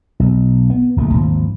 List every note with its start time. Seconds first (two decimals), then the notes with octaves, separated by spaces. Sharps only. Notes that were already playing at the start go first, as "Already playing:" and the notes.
0.20 B1
0.70 B3
0.96 D1 A#1 A3
1.13 G#1 D#2 F3